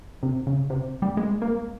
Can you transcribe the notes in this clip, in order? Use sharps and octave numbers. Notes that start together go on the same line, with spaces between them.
C3
C#3
C3
G3
G#3
A#3